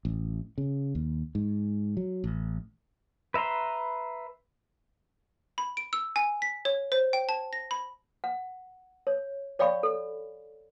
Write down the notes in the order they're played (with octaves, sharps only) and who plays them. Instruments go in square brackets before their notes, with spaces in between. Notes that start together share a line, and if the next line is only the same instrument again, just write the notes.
[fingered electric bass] A1
C#3
D#2
G#2
F#3
A1
[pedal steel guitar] B4 E5 A#5 C6
[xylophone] B5
D7
E6
G#5
B6
C#5
C5
G5
A5
A#6
B5
[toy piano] F#5
C#5
C#5 D5 F5 G5 B5 C#6
A4